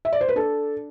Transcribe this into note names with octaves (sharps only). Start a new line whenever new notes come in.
E5
D5
C5
B4
D4 A4